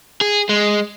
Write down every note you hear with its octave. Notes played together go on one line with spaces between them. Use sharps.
G#4
G#3